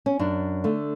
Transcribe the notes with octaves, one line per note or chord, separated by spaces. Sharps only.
C#4
F#2 D4
D3 A3